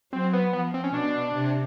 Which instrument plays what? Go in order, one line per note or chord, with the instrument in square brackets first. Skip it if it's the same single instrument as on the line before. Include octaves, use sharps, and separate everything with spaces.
[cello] F#3 [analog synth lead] C4
[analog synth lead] B3
[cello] F3 [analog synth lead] B3
[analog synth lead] C4
C#4
[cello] B2 [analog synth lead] D4
[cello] C3